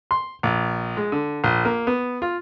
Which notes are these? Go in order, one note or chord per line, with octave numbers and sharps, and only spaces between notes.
C6
A#1
G#3
D3
A#1
A#3
B3
F4